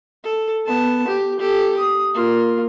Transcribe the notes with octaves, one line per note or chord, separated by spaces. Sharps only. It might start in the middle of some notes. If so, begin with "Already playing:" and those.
A4
B3 A5
G4
G4 A4
D#6
A#3 F4